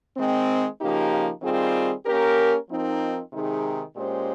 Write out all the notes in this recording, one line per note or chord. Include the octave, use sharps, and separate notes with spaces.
D#3 G#3 C4
C#3 F3 A#3 D#4 G4
D#3 G3 C4 F4 G#4
A#3 C#4 G4 A#4
F3 C4 D#4 A#4
C3 D#3 G#3 D#4 G#4
A#2 G#3 C#4 G4 C5